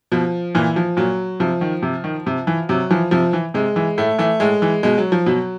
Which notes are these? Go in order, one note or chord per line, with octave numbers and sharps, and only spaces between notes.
B2 F3
A#2 E3
F3
A#2 F#3
C3 F3
D#3
C3
D#3
C3
E3
C3 F#3
E3 F3
C3 F3
E3
C3 G#3
E3
A2 A3
E3 A3
A2 G#3
E3
B2 G#3
F#3
F3
B2 F#3